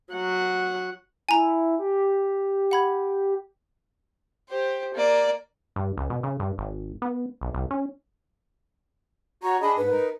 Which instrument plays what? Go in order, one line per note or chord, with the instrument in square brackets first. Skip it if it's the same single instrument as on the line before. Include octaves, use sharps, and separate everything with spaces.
[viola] F#3 F#5
[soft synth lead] E4 [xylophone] G#5 A#5
[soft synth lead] G4
[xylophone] F#5 B5 G#6
[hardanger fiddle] G4 C5
A#3 D5
[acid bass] G2
C#2
B2
C#3
G2
G#1
B3
B1
C2
C#4
[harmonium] F#4 C#5 [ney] A#5
[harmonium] D4 G#4 D#5 [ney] B5
[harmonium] G#2 [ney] B4
[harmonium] D#4 A#4